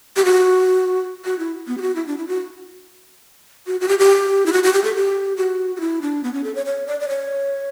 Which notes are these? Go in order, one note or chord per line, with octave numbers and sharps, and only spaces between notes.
G4
F#4
F#4
E4
B3
G4
F#4
E4
D4
E4
F#4
F#4
F#4
G4
G4
E4
F#4
F#4
G4
A4
G4
F#4
F#4
E4
D4
B3
C#4
A4
C#5
C#5
D5
D5
C#5